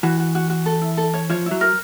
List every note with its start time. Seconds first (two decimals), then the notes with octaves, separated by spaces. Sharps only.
0.03 E3 F#4
0.19 F#4
0.35 F#4
0.50 F#4
0.66 A4
0.81 E4
0.97 A4
1.14 C#5
1.30 F3 C#5
1.46 E4
1.51 F#3
1.61 A#4